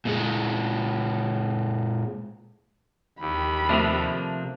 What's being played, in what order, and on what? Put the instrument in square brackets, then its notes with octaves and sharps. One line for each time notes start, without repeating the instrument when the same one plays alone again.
[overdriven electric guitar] A#2 G#3
[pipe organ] D#2 [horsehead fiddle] G4 B5
[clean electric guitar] C3 F3 D4 [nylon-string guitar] A3 A#3 E5